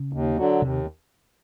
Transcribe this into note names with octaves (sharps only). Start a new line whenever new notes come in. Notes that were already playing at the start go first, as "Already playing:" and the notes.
Already playing: C#3
D#2
D3 F#3
D#2 C3